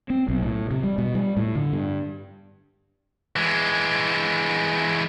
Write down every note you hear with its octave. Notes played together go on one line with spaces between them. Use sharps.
C4
B1
A2
C3
G3
B2
G3
A2
D3
G2
E3 G#3